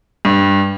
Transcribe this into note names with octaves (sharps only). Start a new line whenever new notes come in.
G2